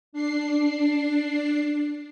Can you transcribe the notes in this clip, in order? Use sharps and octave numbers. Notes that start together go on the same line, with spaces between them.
D4 C7